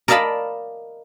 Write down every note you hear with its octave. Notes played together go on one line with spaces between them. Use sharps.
A#4 D5 D#5 F5 A5 B5